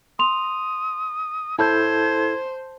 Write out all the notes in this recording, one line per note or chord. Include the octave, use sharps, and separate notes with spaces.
C6 D#6 F7
E4 A4 C5 A5 G6 G#6